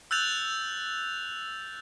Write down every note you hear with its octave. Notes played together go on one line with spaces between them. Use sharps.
E6 F#6 G6 A6 F7